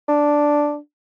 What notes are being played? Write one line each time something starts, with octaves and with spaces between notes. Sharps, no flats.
D4